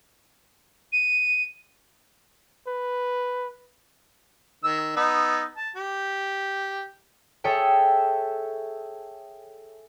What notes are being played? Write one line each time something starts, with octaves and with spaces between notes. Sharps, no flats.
D#7
B4
D#3 E6
B3 D#4 E6
A5
G4
G#4 A4 C#5 E5 G5